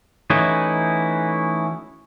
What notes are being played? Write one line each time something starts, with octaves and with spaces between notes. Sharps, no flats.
E3 A3 C#4 D#4 E4 F#4